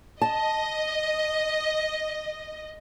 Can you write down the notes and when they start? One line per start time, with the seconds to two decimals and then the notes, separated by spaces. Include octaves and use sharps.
0.21 D#5 A5